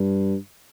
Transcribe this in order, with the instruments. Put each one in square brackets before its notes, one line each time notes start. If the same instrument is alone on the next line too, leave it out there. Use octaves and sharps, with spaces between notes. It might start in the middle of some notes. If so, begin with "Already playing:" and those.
Already playing: [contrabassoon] G2